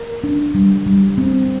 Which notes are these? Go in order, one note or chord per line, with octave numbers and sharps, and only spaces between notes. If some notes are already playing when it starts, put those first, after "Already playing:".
Already playing: A#4
D4
G3
G3
C4